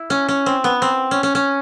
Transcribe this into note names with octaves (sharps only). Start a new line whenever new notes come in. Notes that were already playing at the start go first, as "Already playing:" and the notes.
Already playing: E4
C#4
C#4
C4
B3
C4
C#4
C#4
C#4